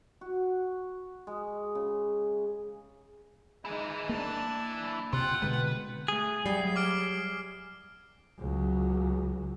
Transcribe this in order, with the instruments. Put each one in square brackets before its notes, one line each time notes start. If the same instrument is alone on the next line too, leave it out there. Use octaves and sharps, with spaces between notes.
[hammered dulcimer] F#4
G#3
C#3
[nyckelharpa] G#3 D#4 [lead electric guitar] E4 G#5
[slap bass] A#3 [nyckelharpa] D4 A5
[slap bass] C3 [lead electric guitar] F4 [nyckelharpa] F#5 G5
[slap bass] B2 D3 G#3 [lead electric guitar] B4
[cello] A3 [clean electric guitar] G#4
[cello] F#3 E5 [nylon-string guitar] G3 [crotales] C7
[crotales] D6 F6 D7
[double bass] C#2 F#3